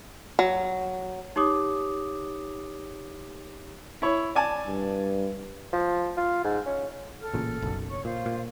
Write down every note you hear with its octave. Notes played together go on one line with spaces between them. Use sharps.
F#3
D#4 G4 C#5 D6 D#6
E4 C#5
D5 G#5 A5
G2
F3
F4
G#2
C#4
A4 F6
A1 A#2 C#3
F#1 B1 F#2
C#5 C#6
A#2 F4 C5 F5
A#2